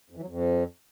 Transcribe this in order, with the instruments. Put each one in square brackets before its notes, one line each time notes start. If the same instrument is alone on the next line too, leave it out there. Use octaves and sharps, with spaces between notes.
[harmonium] F2
E3
F#3
F2